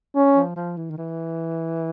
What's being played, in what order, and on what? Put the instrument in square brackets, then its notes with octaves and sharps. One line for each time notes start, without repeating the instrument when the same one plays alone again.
[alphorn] C#4
[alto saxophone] F3
F3
E3
D#3
E3